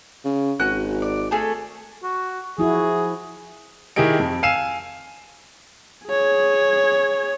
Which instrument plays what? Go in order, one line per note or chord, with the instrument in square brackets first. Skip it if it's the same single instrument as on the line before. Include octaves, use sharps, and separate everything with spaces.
[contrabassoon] C#3
[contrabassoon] G#1 [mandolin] F#4 G#5 F#6
[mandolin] D5
A3 G#4 A4
[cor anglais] F#4
[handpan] F3 E4 F#4 [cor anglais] G#4
[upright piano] D#3 E4 G4 G#4 D#5 D7
F2
F5 G#5 E6 C7 D#7 E7
[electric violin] G#4 C#5